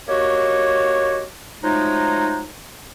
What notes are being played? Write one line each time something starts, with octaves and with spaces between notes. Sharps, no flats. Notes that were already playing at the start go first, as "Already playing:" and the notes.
A#3 D#4 F#4 G4 C#5
F3 F#3 G#3 A3 D#4